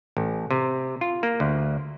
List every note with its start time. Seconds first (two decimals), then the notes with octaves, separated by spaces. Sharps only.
0.17 A1
0.51 C3
1.01 F4
1.23 A#3
1.40 D2